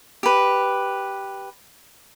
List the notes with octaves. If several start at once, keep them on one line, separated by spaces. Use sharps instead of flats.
G4 B4